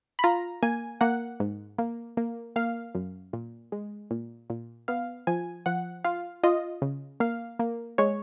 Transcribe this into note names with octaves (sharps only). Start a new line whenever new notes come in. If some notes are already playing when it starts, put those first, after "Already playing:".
B5
F4 A#5
A#3 G#5
A#3 F#5
G#2
A#3
A#3
A#3 F5
F#2
A#2
G#3
A#2
A#2
B3 F5
F3 G#5
F3 F#5
F4 F5
F4 D#5
C#3
A#3 F5
A#3
G#3 C#5